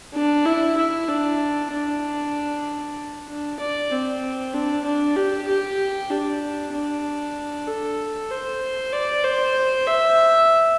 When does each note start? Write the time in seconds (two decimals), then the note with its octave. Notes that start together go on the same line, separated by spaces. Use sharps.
0.14 D4
0.46 E4
0.77 E4
1.08 D4
1.71 D4
3.28 D4
3.60 D5
3.91 C4
4.53 D4
4.85 D4
5.16 G4
5.48 G4
6.10 D4
6.73 D4
7.67 A4
8.30 C5
8.93 D5
9.24 C5
9.87 E5